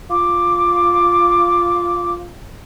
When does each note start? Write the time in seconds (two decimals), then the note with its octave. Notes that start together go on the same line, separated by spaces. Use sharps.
0.10 F4 D6